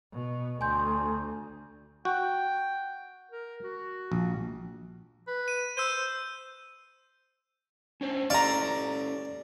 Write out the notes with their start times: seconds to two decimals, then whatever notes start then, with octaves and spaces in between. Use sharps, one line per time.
0.13 B2
0.61 D2 G#5 C6 G6
2.05 F#4 G5
3.31 A#4
3.64 F#4
4.12 A#1
5.27 B4
5.48 D#7
5.77 C5 E6 G6 D#7
8.01 C#4 D4 C5
8.30 C#4 G4 A4 D5 F5 A#5